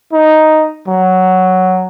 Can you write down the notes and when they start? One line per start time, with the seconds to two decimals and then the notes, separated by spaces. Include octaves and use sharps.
0.13 D#4
0.88 F#3